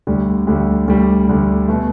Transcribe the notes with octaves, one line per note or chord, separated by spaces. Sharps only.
D2 D3 G3
D2 D3 G3
D2 D3 G3
D2 D3 G3
B2 A3